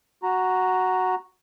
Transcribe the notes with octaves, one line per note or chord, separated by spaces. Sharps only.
F#4 A#5